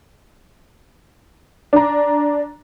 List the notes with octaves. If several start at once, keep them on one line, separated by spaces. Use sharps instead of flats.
D4 A#5